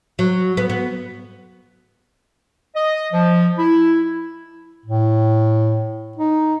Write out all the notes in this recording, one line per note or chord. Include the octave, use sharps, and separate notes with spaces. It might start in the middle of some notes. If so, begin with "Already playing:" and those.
F#3
B3
B3
D#5
F3
E4
A2
D#4